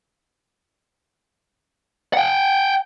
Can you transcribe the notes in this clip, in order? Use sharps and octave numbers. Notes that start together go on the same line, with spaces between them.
F#5 G5